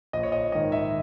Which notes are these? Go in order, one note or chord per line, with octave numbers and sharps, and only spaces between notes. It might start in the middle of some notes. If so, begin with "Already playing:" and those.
A#1 D#5
C#5
D#5
G#2 D#3 D#5
E5